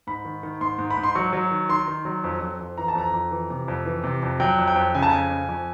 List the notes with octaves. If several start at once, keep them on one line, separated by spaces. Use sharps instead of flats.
G#2 B5
D#3
D#3
G#2 C6
G#2
B5
G#2
C6
F#3 C#6
F#3
D#3
D#3 C6
D#3
F#3
F2
F2
F2
E3 A#5
A5
F2 A#5
F2
E3
C3
F2
E3
C3
F2
F#3 G5
F2
G5
F2
C#3 G#5
A5
F2 G#5
F2
F2